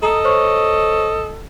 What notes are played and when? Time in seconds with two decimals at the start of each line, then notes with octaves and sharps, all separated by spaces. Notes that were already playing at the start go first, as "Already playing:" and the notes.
0.03 A4 D#5 A#5 D#6
0.24 C5 C#5 C#6